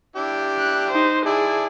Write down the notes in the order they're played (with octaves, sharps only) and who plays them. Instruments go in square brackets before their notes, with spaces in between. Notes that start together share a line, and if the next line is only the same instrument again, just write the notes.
[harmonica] D4 E4 G4
[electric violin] F#6
D#4 C5
[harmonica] E4 D5 A5 [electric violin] G#4